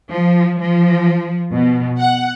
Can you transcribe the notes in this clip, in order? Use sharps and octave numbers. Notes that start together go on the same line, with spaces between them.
F3
F3
B2
F#5